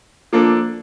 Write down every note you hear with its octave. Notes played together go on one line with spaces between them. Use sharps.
F3 A#3 D4 A4